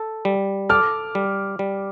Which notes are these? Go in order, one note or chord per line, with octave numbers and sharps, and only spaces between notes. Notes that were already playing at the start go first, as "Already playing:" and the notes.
Already playing: A4
G3
A4 D6 F6
G3
G3